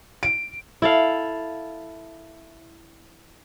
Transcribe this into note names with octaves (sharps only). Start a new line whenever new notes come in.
D7
E4 A4 F5